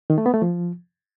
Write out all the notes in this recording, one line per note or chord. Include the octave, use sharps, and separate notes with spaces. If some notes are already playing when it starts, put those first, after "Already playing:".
D#3
A3
B3
A3
F3